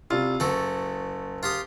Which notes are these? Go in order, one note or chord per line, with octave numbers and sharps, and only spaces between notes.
C2 F4
F#1 F#4 A4
F4 G4 D#6